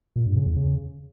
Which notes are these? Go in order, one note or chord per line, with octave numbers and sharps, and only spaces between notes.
A#2
G2
C#3
E2
C#3